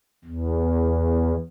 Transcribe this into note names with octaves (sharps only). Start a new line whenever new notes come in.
E2